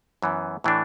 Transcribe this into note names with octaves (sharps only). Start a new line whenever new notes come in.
F#2 E3 B3
A2 E3 A3 D4